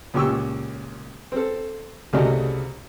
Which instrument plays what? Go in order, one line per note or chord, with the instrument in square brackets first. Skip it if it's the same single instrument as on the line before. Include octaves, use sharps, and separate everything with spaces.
[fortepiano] C#2 A#2 G4 C#6 E6
C4 A4
C2 C#3 A3 F#4 D5 D#5